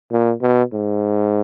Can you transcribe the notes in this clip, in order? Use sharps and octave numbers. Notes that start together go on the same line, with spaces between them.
A#2
B2
G#2